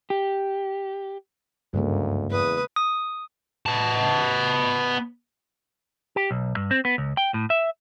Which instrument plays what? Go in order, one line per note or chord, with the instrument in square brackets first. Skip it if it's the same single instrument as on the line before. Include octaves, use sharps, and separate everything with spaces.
[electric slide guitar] G4
[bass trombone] D2 [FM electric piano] G2 [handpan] C#3 G#3 A#3
[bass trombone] E2 [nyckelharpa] B4 D#6
[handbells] D#6
[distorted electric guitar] B3 A5
[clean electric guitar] G4
B1
G2
C4
B3
C#2
G5
A2
E5